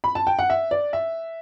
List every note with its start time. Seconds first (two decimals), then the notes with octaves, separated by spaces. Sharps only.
0.04 B5
0.15 A5
0.27 G5
0.39 F#5
0.50 E5
0.71 D5
0.93 E5